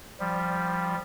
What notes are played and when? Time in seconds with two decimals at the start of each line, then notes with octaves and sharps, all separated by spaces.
0.20 F3 G3